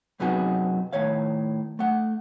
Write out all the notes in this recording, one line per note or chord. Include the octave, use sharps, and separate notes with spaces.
F#2 C3 B3 D#4 F#4 G#4
A2 D#3 C#5 F5
A3 F#5